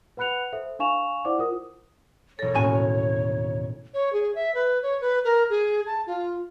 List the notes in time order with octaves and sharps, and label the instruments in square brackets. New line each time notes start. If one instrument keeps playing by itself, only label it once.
[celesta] B4 F#5 B5 F#6 C#7 F7
A4 C5 E5
D4 F5 G#5 C#6 E7 F7
E4 C5 D5 F#5 D6
F4 A#4 D#6
[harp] E1 A#6 [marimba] A4 [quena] C#5
[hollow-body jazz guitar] D#2 G#5 [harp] A2 [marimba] C#4 F#4
[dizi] C#5
G#4
E5
B4
C#5
B4
A#4
G#4
A5
F4